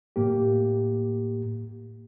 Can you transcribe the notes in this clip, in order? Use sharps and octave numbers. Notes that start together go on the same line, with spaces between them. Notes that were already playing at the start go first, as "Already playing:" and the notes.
A2 A#3 G4